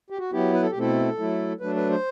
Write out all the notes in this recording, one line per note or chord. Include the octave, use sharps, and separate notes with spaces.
G4
F#4
F#3 B3 E4 G4
B4
A4
G4
B2 A3 C4 E4 A4
F#3 A3 E4
F#3 A3 D4 B4
B4
C5